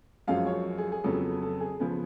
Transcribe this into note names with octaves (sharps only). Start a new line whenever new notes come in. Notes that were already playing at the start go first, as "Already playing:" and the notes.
F#2 F3 G#3 C#4 F5
C#5
G#4
G#4
F2 C#3 F#3 B3 A4
A4
G#4
C#3 F3 B3 G#4